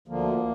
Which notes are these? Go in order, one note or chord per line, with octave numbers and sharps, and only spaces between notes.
D2 D3 F3 A#3